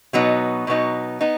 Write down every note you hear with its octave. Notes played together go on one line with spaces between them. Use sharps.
B2 F#3 B3 D#4
B2 F#3 B3 D#4
B3 D#4